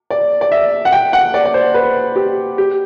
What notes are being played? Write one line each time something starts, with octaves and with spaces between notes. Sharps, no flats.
D5
D5
E5
F#5
G5
F#5
D5
D5
C5
B4
G4
G4